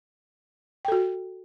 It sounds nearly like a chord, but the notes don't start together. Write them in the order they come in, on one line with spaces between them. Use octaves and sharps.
G5 A4 F#4